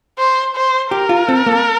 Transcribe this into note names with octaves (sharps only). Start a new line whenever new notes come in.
C5
C5
G4 A#4
F4
C4
A#3